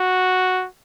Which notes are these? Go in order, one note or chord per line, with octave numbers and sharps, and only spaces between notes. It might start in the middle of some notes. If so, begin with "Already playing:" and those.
Already playing: F#4